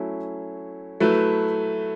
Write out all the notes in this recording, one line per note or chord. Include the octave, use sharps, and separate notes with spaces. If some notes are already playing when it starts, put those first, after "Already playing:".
Already playing: F#3 A3 C#4 E4
F#3 A3 E4 B4